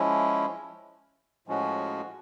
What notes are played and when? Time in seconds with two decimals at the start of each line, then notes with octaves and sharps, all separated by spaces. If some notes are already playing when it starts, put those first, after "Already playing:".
Already playing: F3 G#3 C#4 E4
1.48 A2 F3 G#3 C#4 F#4